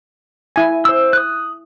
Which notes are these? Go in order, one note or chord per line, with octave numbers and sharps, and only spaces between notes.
E4 G#5
C5 E6
D#6 F#6